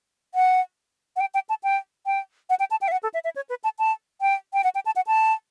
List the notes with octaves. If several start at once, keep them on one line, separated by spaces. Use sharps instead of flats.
F#5
F#5
G5
G5
A5
G5
G5
F#5
G5
A5
G5
E5
F#5
A4
E5
E5
C#5
B4
A5
A5
G5
G5
F#5
G5
A5
F#5
A5